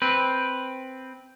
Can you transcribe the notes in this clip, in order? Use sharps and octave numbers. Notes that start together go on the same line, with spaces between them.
C4 B4